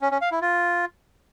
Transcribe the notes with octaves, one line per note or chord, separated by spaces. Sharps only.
C#4
C#4
F5
E4
F4